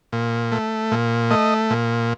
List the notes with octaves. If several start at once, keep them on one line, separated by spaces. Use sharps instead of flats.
A#2
A3
A#2
A3 D#5
A#2